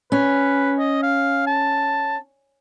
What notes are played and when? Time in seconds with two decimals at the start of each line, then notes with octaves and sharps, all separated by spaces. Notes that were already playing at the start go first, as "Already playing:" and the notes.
0.12 C#4 B4
0.79 D#5
1.03 F5
1.47 A5